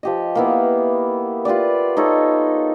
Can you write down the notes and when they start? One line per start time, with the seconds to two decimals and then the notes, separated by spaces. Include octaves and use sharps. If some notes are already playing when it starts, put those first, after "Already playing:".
0.03 F3 G4 D#5
0.35 A#3 B3 E4
1.45 F4 G4 B4 D5
1.97 D#4 A4 C#5